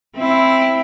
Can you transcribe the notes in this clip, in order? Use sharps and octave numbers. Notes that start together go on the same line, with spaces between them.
C4 E4